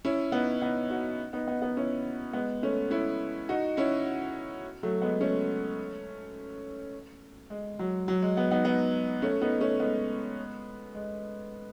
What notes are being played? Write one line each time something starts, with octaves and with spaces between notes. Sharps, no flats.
C#4 E4
B3 D#4
B3 D#4
D#4 F#4
B3 D#4
B3 D#4
B3 D#4
C#4 E4
G#3 B3
A3 C#4
C#4 E4
D#4 F#4
C#4 E4
F#3 A3
G#3 B3
A3 C#4
G#3
F#3
F#3
G#3
G#3 B3
B3 D#4
B3 D#4
A3 C#4
B3 D#4
A3 C#4
G#3 B3
G#3